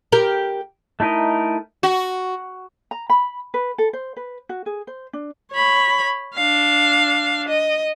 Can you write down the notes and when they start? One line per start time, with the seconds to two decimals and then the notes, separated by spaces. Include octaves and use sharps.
0.12 G4 A#4
1.00 A3 D#4 E4 A#4 D#5
1.83 F#4
2.91 A#5
3.10 B5
3.54 B4
3.78 A4
3.93 C5
4.17 B4
4.49 F#4
4.66 G#4
4.87 C5
5.13 D4
5.52 C#5 B5
6.34 D4 F5
7.49 D#5